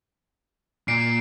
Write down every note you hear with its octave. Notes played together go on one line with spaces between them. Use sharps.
A#2 C7 D7